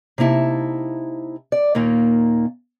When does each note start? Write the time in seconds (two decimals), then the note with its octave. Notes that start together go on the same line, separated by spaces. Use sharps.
0.18 C3 A#3 D#4 E4 A5
1.52 D5
1.75 D#2 A#2 D#3 A#3